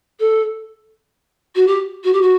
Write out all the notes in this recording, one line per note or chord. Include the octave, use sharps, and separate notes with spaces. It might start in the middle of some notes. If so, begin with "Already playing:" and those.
A4
F#4
G4
F#4
G4
F#4